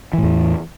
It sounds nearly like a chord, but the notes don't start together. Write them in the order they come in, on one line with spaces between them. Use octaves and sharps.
E3 A2 E2